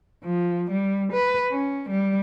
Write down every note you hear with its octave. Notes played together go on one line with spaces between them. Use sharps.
F3
G3
B4
C#4
G3